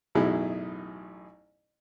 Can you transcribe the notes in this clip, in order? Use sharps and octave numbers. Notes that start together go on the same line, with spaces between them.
A1 F#2 B2 D#4 E4 G#4